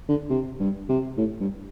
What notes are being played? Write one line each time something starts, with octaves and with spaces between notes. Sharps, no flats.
D3
C3
G2
C3
A2
G2